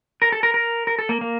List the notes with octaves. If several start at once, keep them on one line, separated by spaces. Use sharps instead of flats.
A#4
A4
A#4
A#4
A#4
A4
A#3
A#3